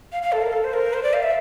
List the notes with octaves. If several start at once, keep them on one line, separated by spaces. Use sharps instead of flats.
F5
F5
A4
A#4
A4
C5
A#4
C5
D5
F5
E5